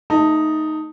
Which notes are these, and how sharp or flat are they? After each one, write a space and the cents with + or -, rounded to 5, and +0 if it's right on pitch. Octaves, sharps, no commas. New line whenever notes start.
A3 +0 D#4 +0 A5 +30